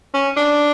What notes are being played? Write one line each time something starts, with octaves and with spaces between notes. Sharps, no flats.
C#4
D4